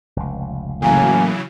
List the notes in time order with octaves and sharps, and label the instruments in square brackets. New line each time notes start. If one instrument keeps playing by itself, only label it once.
[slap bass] F1 C#2
[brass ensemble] A2 A#3 [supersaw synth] C#3 E3 F#3 [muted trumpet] G#5